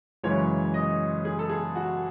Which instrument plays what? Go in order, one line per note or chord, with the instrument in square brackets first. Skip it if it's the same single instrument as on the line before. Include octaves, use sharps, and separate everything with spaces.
[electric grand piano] F#2 C#3 E3 G#3 [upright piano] C#5
[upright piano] D#5
G#4
A4
G#4
F#4